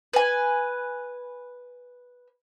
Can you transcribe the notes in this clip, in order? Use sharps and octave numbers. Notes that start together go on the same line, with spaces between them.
B4 G#5